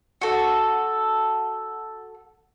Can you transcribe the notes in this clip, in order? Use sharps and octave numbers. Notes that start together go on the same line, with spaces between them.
F#4 A4